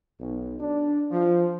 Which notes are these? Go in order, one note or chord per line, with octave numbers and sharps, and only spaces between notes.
B1
D4
F3